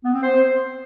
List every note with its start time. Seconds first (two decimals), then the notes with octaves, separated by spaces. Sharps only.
0.04 B3
0.13 C4
0.23 C5